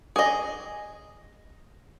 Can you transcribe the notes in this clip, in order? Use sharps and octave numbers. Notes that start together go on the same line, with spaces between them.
G#4 D#5